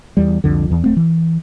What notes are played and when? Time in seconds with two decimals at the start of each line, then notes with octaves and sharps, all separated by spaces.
0.17 E2 G3
0.44 C2 F2 D3
0.70 E2 E3
0.84 D1 A3 C4
0.97 E3